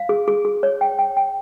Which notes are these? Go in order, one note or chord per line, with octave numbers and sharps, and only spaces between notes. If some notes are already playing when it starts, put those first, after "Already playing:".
Already playing: F5
G#4
G#4
G#4
C#5
G5
G5
G5